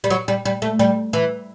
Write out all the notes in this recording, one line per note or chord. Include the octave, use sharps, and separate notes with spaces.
G3
F#3
G3
G3
A3
G3
E3